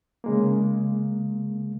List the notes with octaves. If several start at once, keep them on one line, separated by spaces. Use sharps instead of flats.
C#3 G#3 A#3